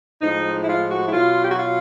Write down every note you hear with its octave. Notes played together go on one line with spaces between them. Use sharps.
A2 F3 G#3 D#4
E4
F4
F#4
E4
B2 F#3 F4
G4
F#4
F4